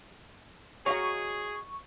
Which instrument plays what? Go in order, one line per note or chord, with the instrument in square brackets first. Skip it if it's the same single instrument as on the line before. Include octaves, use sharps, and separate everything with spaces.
[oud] F#4 D#5 F5 [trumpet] G#4 [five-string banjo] C#5 A#5 [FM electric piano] C#6